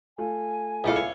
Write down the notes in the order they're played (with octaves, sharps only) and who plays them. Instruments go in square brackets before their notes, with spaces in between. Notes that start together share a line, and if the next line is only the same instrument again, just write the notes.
[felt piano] A3 F4 [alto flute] G#5
[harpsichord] C#2 D4 A4 [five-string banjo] B3 E4 F5 [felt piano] E5
[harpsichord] C#5